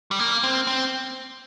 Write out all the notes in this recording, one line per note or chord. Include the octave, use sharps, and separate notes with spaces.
G3
A#3
C4
C4